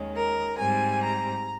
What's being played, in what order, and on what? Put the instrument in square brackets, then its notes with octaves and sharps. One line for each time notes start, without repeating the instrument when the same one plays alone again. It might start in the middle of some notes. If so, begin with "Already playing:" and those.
Already playing: [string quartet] D#2 D#3 G#3 C#4
A#4
G#2 G3 C4 G#5
A#5